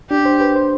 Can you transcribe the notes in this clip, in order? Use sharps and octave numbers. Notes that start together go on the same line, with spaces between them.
D4 G4
C5
B4
C5